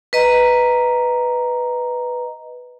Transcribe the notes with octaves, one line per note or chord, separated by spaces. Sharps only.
B4 D#5 A#5